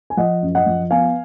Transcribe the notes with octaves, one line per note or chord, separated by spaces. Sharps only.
G#5
F3 D#5 F#5
F#2
D#5 F#5
F3
B3 F5 G#5